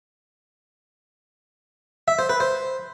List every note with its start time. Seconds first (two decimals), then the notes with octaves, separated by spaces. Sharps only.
2.08 E5
2.19 C5
2.29 B4
2.40 C5